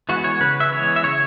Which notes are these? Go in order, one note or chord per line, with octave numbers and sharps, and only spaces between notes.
E3 G#3 B3 F#4
C#5
C#3 B4
E5
E3 G#3 B3 C#5
E5
C#3 C#5